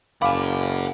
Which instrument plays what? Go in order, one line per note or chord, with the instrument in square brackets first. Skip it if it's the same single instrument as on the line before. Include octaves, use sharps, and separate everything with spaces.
[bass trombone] F#1 [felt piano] F5 B5 D6 [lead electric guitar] F#5 G#5